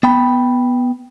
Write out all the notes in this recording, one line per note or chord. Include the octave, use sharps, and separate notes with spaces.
B3 G5 B5